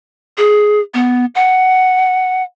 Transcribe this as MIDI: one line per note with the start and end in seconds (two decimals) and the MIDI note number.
0.37 0.80 68
0.94 1.25 59
1.35 2.43 78